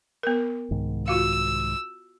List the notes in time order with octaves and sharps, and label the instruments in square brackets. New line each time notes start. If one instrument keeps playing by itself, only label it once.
[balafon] B3 A#4
[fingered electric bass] C2 G#2 D#3
[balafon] F4 F#4 F5 [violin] E6